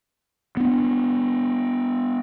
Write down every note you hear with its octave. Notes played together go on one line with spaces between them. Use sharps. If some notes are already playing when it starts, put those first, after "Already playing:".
B3 D4